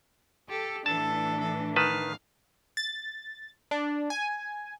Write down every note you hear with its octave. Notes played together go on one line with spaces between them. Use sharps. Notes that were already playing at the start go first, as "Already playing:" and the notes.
G4 A4
A2 E3 D4 A4 A5
A4
D#3 B4 F5 A5
A6
D4
G#5